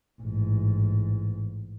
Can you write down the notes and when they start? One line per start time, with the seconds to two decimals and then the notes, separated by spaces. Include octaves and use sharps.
0.21 A1 G#2